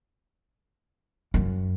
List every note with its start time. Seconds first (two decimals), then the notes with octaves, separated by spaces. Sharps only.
1.34 F#2